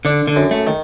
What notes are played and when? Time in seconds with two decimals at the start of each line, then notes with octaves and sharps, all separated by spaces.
0.05 D3 D4
0.28 D3
0.36 F#2
0.51 A3
0.67 D#3